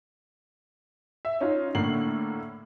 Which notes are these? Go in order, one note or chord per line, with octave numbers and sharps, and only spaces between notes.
E5
C#4 D#4 F4
A2 D3 A#3 C7 F#7